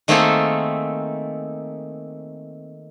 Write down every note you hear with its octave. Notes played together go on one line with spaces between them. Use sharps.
D#3 A3 A#3 C4 G#4 A4